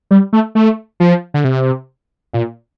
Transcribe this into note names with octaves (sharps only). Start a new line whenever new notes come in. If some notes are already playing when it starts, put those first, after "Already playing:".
G3
A3
A3
F3
D3
C3
A#2